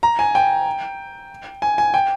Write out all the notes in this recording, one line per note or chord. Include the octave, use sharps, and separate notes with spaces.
A#5
G#5
G5
G#5
G#5
G5